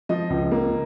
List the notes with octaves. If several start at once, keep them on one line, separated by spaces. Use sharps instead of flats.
F3 D#5
C#2
A#3